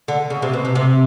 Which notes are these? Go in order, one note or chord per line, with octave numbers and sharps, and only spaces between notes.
D3
C#3
C3
B2
C3
C3